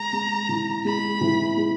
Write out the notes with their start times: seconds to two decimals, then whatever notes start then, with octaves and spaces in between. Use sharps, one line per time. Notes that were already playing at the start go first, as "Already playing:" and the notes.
Already playing: G#3 A#5
0.13 G#3
0.49 E3
0.85 G#3 B5
1.21 E3
1.57 G#3